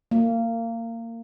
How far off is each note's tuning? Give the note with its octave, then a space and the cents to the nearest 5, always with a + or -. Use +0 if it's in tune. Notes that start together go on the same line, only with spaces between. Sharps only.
A#3 -25